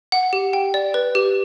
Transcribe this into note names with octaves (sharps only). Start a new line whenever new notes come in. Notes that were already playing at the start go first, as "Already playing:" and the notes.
F#5
G4
G5
D5
B4
G4